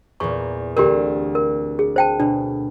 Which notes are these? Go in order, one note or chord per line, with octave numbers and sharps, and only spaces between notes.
E2 A#2 C#6
D2 C4 G4 A#4
A#4
G#4
C5 G5 A5
B2 D4